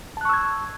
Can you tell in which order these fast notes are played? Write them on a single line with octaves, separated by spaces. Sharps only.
A5 F#6 C#6 E6 G#6